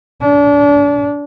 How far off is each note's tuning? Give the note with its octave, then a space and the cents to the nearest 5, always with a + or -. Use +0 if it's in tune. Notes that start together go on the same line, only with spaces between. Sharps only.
D4 -35